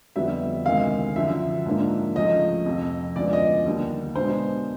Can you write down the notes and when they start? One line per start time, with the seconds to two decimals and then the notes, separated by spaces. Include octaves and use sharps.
0.16 F2 D3 G3 B3 E5
0.66 D2 C3 D#3 G#3 F5
1.16 F#2 D3 F3 E5
1.66 G#2 F3 A#3 D4
2.16 C#2 C#3 F3 A3 D#5
2.66 F2 C3 F3
3.16 D2 C#3 F3 G#3 B3 D5
3.33 D#5
3.66 D#2 D3 G3
4.16 B2 G#3 B3 D4 C5